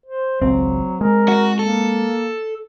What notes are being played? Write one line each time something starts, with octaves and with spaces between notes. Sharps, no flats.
C5
G#1 C#2 F#3 C4
G#3 A#4
F#4
A#3 A4